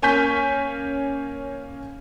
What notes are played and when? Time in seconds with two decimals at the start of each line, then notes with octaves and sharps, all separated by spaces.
0.02 A#3 C#4 G#5 C#6 G6 B6